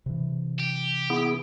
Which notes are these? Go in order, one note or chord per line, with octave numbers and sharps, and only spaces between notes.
C3 E3
G4
B3 E4 G#4